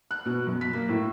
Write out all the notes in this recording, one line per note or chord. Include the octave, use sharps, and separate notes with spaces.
F#6
B2
F#2
B6
A#3
A2